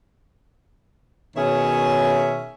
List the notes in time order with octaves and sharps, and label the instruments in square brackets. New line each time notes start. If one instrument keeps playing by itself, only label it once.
[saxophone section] B2 D#3 C#4 G#4 C#5 E5